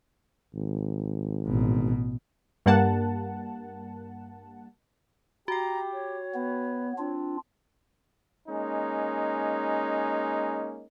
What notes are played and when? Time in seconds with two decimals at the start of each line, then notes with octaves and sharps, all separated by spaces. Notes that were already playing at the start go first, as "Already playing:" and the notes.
0.54 G#1
1.46 A1 B2
2.66 G2 G3 A#3 F#5 A5
5.48 F#4 G4 G5 A#5
5.93 C#5
6.35 B3 B4
6.98 C4 D4 F4
8.48 G#3 A#3 C#4 D#4